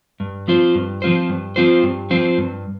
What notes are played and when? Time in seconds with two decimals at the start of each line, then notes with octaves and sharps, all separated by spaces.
0.20 G2
0.48 F3 C4 F4 C5
0.75 G2
1.02 F3 C4 F4 C5
1.29 G2
1.56 F3 C4 F4 C5
1.83 G2
2.10 F3 C4 F4 C5
2.38 G2